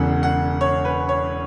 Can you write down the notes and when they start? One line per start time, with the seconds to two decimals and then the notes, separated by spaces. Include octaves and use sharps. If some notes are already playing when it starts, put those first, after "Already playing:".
Already playing: E1 E2 C#3 F#5
0.23 F#5
0.61 C#5
0.85 B4
1.09 C#5